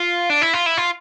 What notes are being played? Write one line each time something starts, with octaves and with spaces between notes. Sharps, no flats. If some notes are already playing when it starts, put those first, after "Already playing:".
Already playing: F4
D4
E4
F4
E4
F4